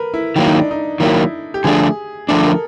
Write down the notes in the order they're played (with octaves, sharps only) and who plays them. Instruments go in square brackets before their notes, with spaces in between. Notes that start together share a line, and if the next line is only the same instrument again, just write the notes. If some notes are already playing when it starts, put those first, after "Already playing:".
Already playing: [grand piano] A#4 B4
E4
[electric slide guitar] D#3 F#3 A#3 [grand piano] E4
[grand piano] D#4
D4
D#4
[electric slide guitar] D#3 F#3 A#3 [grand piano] E4
[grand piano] G4
[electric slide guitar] D3 F3 A3 D4 [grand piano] G#4
[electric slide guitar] D3 F3 A3 D4 [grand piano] A4
[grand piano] A#4